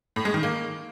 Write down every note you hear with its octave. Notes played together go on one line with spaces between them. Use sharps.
A2
G#3
D#3
A#3